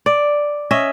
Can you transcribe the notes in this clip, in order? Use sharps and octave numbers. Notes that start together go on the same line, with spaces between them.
D5
C#4 D#5 E5